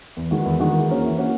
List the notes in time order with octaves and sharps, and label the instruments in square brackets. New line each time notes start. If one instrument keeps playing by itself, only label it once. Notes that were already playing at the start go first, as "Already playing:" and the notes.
[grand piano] E2
D#3 G#3 B3 F#4
E2
D#3 G#3 B3 F#4
E3
A#3 C#4 F#4
E3
A#3 C#4 F#4